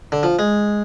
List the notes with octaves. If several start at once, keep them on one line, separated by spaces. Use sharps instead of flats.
D3
F3
G#3